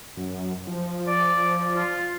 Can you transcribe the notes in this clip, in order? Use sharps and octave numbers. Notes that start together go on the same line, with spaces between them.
F#2
F3
D5
F4